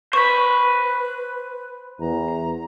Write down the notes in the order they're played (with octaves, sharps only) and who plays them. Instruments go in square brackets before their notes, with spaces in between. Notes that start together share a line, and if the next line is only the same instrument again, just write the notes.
[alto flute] B4 [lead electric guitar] C5 B5 [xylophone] C#6
[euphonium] E2 [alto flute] A#5